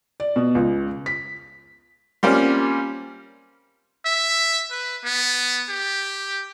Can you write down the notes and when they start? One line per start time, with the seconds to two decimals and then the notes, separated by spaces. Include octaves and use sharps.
0.20 D5
0.36 B2
0.55 C#2
1.06 B6
2.23 G3 A#3 C4 C#4 F4
4.06 E5
4.71 B4
5.04 B3
5.69 G4